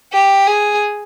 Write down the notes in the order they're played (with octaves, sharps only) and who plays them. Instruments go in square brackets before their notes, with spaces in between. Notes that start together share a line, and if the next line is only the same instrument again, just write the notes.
[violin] G4
G#4